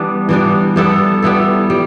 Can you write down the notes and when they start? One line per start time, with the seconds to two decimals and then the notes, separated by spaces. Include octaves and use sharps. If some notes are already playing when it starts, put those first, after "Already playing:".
Already playing: E3 G3 B3 D4
0.29 E3 G3 B3 D4
0.76 G3 B3 E4 A4
1.23 G3 B3 E4 A4
1.70 G3